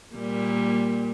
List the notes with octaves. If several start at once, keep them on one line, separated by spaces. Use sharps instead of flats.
A#2 G3 A#3